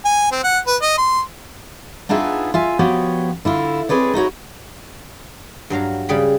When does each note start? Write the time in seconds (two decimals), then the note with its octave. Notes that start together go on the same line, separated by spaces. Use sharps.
0.05 G#5
0.31 C4
0.44 F#5
0.67 B4
0.82 D#5
0.98 C6
2.09 B3 D4 D#4 F4 G#4 E5
2.54 F4 E5 G#5
2.79 F3 B3 F#4 G4 C#5
3.45 D3 E4 F4
3.89 C4 G#4 B4 C#5 D5
4.14 D#4 E4 F#4 C#5
5.70 G2 F#3 F5 A#5
6.09 C#3 G3 G#4 G5 B5